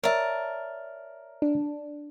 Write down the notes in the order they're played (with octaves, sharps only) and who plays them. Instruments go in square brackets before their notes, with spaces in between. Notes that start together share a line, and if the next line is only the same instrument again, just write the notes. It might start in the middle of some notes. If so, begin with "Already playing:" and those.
[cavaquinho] A#4 A5 [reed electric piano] C#5 D5 E5
[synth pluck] D4